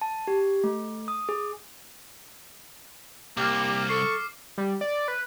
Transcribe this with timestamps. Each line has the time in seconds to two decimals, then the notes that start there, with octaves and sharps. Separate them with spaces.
0.01 A5
0.27 G4
0.64 A3
1.08 D#6
1.29 G#4
3.37 C2 A#3 G4 D6 F6
3.89 A4 C#6 C7
4.58 G3
4.81 D5
5.08 B4